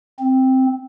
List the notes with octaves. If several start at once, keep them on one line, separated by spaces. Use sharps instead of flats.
C4